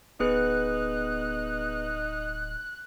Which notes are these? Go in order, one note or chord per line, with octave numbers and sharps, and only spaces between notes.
D1 B3 D#4 G#4 B4 F#6